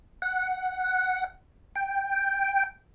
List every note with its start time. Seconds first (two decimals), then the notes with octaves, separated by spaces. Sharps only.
0.22 F#5
1.75 G5